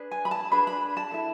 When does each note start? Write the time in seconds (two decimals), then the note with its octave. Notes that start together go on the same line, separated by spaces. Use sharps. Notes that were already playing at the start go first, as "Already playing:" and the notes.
Already playing: D4 G#4 B4
0.11 G#5
0.25 B5
0.31 A5
0.52 D4 G#4 B4 B5
0.67 B5
0.97 A5
1.11 E4 A4